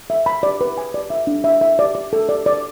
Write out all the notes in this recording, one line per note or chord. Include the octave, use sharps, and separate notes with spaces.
E5
B5
D5
B4
G#5
D5
E5
D4
E5
E5
D5
D5
A4
D5
D5